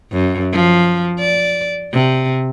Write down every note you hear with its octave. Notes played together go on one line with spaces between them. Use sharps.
F#2
F3
D5
C3